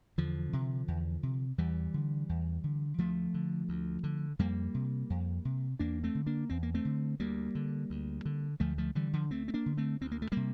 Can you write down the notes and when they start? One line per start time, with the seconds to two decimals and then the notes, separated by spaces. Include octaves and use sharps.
0.18 E2 D3 F3
0.53 C3
0.88 E2
1.23 C3
1.58 E2 E3 G3
1.94 D3
2.29 E2
2.64 D3
2.98 D2 F3 A3
3.34 D3
3.69 D2
4.04 D3
4.39 F2 G3 A#3
4.74 C3
5.10 F2
5.45 C3
5.79 E2 A#3 D4
6.04 A3 C4
6.15 D3
6.26 A#3 D4
6.50 E2 C4
6.63 A#3
6.74 A3 C4
6.85 D3
7.20 D2 G3 A#3
7.55 D3
7.90 D2
8.25 D3
8.60 D2 F3 A3
8.78 F3 A3
8.95 D3 E3 G3
9.13 D3 F3
9.30 D2 A3 C4
9.48 C4
9.54 A#3 D4
9.66 D3
9.77 A3 C4
10.01 D2 C4
10.12 A#3
10.22 A3
10.32 C3 G3 A#3